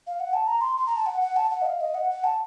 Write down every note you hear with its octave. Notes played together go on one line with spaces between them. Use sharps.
F5
F#5
A5
A#5
C6
C6
A#5
A5
F#5
F#5
A5
F#5
D#5
F5
D#5
F#5
F#5
A5